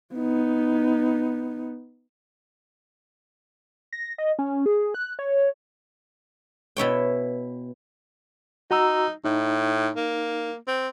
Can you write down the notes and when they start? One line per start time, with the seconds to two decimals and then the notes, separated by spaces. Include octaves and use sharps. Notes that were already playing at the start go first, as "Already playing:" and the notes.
0.15 B3 D#4
3.93 A#6
4.18 D#5
4.39 C#4
4.66 G#4
4.94 F#6
5.19 C#5
6.77 B2 E4 C#5 G5
8.71 D#4 F#4 A#5 E6
9.24 A2 D#4
9.97 A#3
10.67 C4